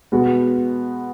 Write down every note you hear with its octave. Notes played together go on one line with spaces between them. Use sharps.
B2 G#3 B3 F#4